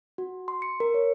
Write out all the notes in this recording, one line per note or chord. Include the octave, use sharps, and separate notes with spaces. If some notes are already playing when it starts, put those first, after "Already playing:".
F#4
C6
C#7
A#4
C#5